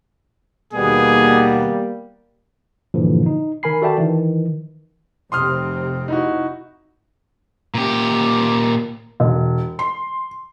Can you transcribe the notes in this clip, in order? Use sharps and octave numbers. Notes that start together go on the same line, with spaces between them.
D#2 B2 G3 A#3 B3 G#4
G2 A#2 D3 E3 F3
D#4
D#3 A#4 G#5 B5 C7
F#4 A4 D5 E5 G5 A5
D#3 E3
F1 C3 C4 C6 D#6 F6
D#4 E4 F#4
A#2 G4
E1
C6